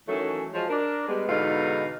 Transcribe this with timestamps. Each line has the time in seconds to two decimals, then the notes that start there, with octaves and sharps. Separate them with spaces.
0.07 D#3 E3 F#3 A3 C#4
0.53 F3 F#3 G#3
0.68 D4 A#4
1.06 G3 G#3 B3
1.28 E2 G#2 B2 D3 D#4 F5